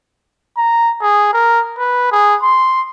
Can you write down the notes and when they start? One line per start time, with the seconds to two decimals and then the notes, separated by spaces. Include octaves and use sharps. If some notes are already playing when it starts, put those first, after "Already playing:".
0.57 A#5
1.01 G#4
1.33 A#4
1.78 B4
2.12 G#4
2.43 C6